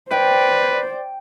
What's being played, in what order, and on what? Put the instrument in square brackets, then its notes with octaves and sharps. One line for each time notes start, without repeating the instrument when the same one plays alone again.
[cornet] B4 [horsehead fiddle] C5 D5 [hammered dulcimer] G5